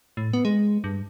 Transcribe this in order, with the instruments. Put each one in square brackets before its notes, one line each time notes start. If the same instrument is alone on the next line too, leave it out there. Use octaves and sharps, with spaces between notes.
[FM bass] A2
B3
G#3
G2